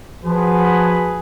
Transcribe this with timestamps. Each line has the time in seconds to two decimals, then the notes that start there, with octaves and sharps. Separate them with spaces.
0.24 F3 F#4 G#4 B4